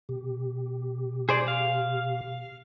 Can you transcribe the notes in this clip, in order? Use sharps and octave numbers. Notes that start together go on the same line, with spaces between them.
B2 G4
G#4 C5 D5
F5